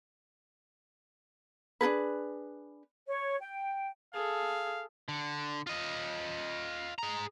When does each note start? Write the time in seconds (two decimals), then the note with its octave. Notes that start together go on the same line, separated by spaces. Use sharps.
1.81 D4 D#4 G#4 B4
3.08 C#5
3.41 G5
4.14 G#4 A4 F5
5.08 D3
5.67 F4 D#5
6.99 G#4 A#5